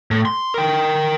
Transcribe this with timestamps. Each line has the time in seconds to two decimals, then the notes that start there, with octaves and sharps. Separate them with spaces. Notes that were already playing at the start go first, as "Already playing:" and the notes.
0.11 A2
0.25 C6
0.54 A#4 G5